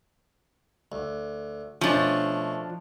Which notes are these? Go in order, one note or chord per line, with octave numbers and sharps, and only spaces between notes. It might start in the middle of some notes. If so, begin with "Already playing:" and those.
D2
B2 F3 A3 C#4 D4